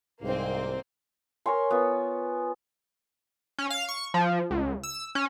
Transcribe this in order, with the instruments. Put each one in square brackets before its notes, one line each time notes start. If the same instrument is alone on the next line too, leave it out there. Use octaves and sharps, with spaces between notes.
[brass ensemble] C2 G#2 [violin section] A#3 C4
[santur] A#4 C#5 G#5 C6
B3 F4
[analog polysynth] C#4
F5
C#6
F3
C#2
E6
C#4